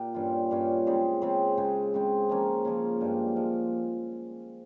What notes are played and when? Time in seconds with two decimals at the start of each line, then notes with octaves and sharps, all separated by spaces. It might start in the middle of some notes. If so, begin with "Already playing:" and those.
Already playing: A#2 G4
0.14 G2 G3 C#4 F4
0.51 G2 G3 C#4 F4
0.87 C#3 G#3 C4
1.22 C#3 G#3 C4
1.57 C#3 G#3 C4
1.94 C#3 G#3 C4
2.29 C#3 F3 A#3 C#4
2.65 C#3 F3 A#3 C#4
3.01 G2 F3 G#3
3.36 F3 G#3